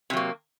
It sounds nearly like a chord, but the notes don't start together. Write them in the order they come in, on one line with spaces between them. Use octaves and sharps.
C3 F#3 A#3